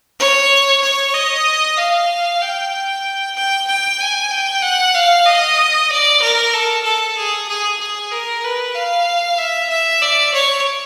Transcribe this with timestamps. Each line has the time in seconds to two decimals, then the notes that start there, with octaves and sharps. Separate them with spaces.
0.20 C#5
0.83 C#5
1.14 D#5
1.77 F5
2.42 G5
3.36 G5
3.67 G5
4.00 G#5
4.31 G5
4.63 F#5
4.94 F5
5.26 D#5
5.90 D5
6.22 A#4
6.54 A4
6.84 A4
7.17 G#4
7.48 G#4
7.80 G#4
8.12 A#4
8.44 B4
8.75 F5
9.38 E5
9.70 E5
10.02 D5
10.34 C#5